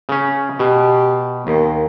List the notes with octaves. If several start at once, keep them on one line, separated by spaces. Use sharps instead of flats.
C#3 C#4
B2 G4
D#2 D#3